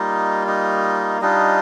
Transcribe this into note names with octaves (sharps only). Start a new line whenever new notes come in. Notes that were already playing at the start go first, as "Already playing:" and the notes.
Already playing: G3 A#3 D#4 F4 D#5
D#4 D#5
G3 D4 D#4 F4 D#5